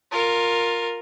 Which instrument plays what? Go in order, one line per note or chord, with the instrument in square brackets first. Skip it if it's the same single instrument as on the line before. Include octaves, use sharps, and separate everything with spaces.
[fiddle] F4 A#4